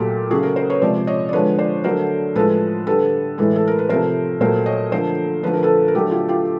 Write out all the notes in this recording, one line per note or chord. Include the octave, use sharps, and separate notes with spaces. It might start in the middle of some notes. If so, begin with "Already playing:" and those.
Already playing: A#2 F#3 A3 G4 A4
C#3 F#3 A3 F#4 G#4
G#4 A#4
A#4 C5
B4 C#5
C3 F3 G#3 C5 D5
C#5 D#5
D5
D3 F3 G#3 B4 C#5
C5 D5
D3 F#3 A3 A#4 C5
A2 F3 G#3 A4 B4
D3 G3 A4 B4
A2 E3 G#3 A4 B4
A4
A#4
B4
C3 F3 A3 A#4 C5
A#2 F#3 A3 A#4 C5
C#5 D#5
D3 F3 A3 A#4 C5
D3 F3 A3 B4
A#4
A4 B4
A#4
D3 F#3 A3 G4 A4
F4 G4
F4 G4